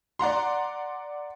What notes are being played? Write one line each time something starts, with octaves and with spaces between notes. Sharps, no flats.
D5 F#5 A#5 C6